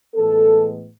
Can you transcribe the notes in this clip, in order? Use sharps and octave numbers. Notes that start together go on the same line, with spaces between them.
A2 E3 G#3 B3 A4